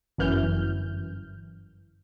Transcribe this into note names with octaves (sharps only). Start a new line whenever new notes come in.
G1 F#2 E3 F6 G6